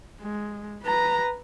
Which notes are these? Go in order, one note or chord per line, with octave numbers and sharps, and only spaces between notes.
G#3
B4 A#5